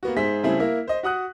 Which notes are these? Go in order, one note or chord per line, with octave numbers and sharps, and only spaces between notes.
A#3 B3 F#4
G#2 G#4 C5 E5 B6
C#3 G3 A3 C4 E4 G#4
A#3 E4 A#4
C5 D#5
F#4 F#5 D#6 F#6